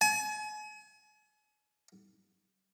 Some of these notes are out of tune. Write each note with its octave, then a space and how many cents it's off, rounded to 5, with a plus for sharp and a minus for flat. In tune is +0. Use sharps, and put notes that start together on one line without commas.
G#5 +40